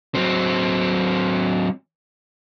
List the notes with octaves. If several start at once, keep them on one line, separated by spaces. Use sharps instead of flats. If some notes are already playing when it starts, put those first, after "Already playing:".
F#3 C4